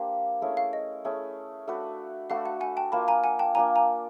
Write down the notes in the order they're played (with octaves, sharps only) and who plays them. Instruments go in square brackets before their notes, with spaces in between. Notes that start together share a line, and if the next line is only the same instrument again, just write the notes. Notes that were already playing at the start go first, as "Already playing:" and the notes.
Already playing: [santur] A#3 D4 G4 C5 [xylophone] F5
[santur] A3 C#4 E4 G#4
[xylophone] F5
D#5
[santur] A3 C#4 E4 G#4
A3 D4 F#4 B4
[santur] A3 D4 F#4 B4 [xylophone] F5
[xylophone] F#5
F#5 G#5
G5 A5
[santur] A#3 D4 F4 [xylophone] A5 B5
[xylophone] G#5 A#5
F#5 G#5
G5 A5
[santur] A#3 D4 F4 [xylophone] G#5 A#5
[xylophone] G#5 A#5